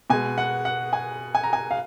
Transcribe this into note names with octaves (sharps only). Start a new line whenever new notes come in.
B2 G#3 G#5
F#5
F#5
G#5
G#5
A#5
G#5
F5